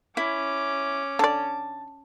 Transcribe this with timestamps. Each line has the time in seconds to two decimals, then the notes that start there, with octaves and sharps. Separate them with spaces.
0.17 C#4 E4 D6
1.19 D3 D5 A5